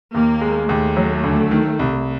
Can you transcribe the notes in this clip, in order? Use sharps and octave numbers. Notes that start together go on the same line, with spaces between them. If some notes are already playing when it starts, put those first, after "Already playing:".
D#2 A#3
G#3
D#2 A3
F#3
D2
D#3
C2